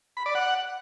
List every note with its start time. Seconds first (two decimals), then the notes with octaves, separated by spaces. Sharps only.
0.17 B5
0.26 D5
0.35 F#5